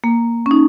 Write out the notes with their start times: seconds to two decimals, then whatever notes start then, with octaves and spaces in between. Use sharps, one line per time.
0.04 A#3
0.46 C#4
0.51 D#4